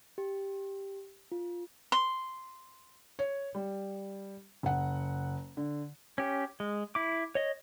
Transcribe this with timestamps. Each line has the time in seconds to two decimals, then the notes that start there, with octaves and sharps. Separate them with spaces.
0.18 G4
1.32 F4
1.92 C6
3.19 C#5
3.55 G3
4.63 F#1 F#5
5.57 D3
6.18 C#4 G4
6.60 G#3
6.95 E4 D6
7.35 C#5 D#5